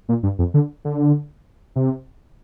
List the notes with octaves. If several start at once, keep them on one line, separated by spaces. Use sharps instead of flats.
A#2
G2
F2
D3
D3
C3